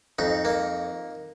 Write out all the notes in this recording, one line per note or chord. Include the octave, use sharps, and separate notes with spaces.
F2 D#4
A#3